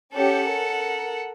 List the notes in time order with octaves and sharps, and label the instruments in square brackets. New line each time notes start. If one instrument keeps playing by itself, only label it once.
[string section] C#4 G4 [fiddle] A4 F#5
[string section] A#4